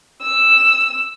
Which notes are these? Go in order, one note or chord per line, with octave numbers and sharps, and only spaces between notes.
E6